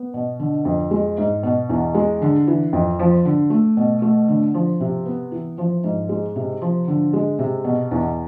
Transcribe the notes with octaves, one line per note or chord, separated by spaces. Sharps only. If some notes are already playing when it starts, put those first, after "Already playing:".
Already playing: B3
B2
D3
F2
G#3
G#2
B2
E2
G#3
D3
E3
F2
F3
D3
A3
B2
A3
D3
F3
C3
B3
E3
F3
G#2
G#3
C3
F3
D3
G#3
C3
B2
E2